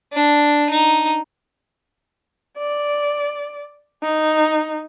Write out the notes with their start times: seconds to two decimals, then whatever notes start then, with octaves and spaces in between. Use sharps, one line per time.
0.13 D4
0.70 D#4
2.58 D5
4.03 D#4